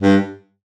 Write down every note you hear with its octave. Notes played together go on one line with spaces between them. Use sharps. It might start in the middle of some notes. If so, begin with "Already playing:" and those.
G2